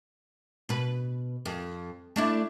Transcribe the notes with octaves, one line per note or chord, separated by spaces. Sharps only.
B2 B4
F2
A3 D4 E4